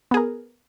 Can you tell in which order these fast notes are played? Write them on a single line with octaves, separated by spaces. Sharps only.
B3 G#4 A#4